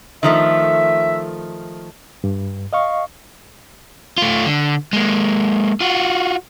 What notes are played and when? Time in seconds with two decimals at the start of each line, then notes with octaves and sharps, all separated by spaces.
0.23 D#3 F3 A3 E5
2.24 G2
2.73 D#5 F5 C#6
4.18 A3 F4
4.46 D3
4.93 G#3 A#3
5.81 F4 F#4